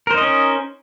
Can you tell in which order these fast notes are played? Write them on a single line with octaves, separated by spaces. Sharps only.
A#4 C5 D#4 D#5 C#4